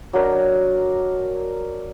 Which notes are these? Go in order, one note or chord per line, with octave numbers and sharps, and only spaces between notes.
F#3 D4 A#4 D#5